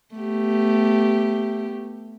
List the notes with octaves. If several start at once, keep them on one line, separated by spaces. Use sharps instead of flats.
A3 B3 G4